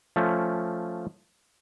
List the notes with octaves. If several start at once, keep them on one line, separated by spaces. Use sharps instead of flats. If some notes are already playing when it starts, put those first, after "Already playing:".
F3 A3 C#4